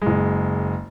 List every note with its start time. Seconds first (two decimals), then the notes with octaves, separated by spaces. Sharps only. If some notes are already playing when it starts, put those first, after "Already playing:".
0.02 F#1 G#3